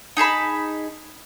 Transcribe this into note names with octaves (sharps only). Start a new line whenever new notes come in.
D#4 G#4 A5 B5